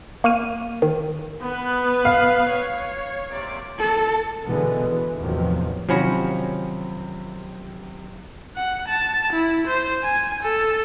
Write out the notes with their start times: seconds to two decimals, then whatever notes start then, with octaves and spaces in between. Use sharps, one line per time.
0.24 A#3 C#6 F6 D#7
0.82 D#3
1.41 B3 B4
2.05 F5
2.50 C#5
3.30 C3 A#3 D5
3.78 A4
4.47 B2 D3 E3 G#3 B3
4.87 E3
5.18 E2 A2 C3 D#3 F3 F#3
5.89 C3 D#3 F3 F#3 C#4 F#4 B5
8.56 F#5
8.88 A5
9.32 E4
9.67 C5
10.03 G#5
10.43 A4